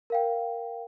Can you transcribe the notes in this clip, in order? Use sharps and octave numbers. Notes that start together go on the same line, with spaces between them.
A#4 F5 G5